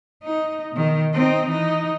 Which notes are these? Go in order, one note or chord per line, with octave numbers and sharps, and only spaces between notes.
D#4
B2 D#3
C4 D#4
E3 D#4